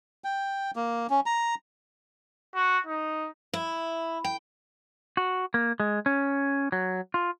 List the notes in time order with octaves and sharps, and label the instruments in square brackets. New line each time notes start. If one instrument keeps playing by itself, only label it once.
[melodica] G5
A#3
C#4
A#5
[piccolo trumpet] F#4
D#4
[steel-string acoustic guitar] E4
G5
[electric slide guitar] F#4
A#3
G#3
C#4
F#3
F4